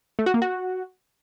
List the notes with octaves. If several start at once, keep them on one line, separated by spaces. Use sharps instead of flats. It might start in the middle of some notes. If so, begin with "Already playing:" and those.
A3
F#4
A#3
F#4